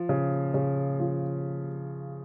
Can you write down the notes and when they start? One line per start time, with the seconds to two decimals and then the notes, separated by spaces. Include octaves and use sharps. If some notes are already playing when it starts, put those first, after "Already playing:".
Already playing: F3
0.09 C#3
0.54 C#3
0.99 F3